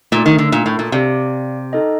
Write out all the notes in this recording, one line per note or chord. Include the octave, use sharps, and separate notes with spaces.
A#2 A3 D#4 A#4
D#3
D3
A#2
A2
A#2
C3 G4 D5 F5
D#4 A4 D#5 G5